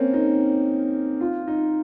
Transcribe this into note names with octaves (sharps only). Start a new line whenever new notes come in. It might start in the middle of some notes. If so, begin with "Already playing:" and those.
Already playing: A#3 C4 C#4
D#4
F4
D#4